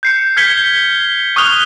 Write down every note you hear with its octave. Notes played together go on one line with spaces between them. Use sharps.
G6 C7 C#7
F6 G6 G#6 B6 C#7 G7
C#6 D#6 F6 F#6 F7 G7